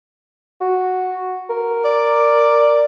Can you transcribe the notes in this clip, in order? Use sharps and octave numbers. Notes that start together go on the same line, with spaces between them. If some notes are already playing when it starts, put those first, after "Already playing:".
F#4
A#4
D5